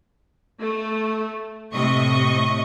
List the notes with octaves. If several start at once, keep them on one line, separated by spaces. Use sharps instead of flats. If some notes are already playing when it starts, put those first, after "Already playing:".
A3
A2 C3 D#5 C#6